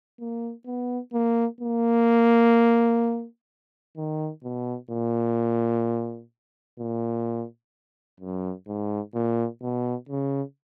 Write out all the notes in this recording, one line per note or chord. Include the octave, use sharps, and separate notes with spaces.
A#3
B3
A#3
A#3
D#3
B2
A#2
A#2
F#2
G#2
A#2
B2
C#3